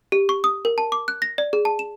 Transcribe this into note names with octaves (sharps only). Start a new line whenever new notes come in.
G4
C#6
D#6
A#4
A5
D6
F#6
A#6
D5
G#4
A5
E7